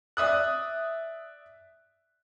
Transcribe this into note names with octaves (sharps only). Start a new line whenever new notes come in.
D5 E5 D#6 F#6